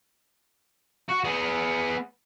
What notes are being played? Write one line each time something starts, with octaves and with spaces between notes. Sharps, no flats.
F#4
B3 G#4